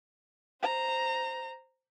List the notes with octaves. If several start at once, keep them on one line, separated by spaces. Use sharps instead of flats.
C5 A#5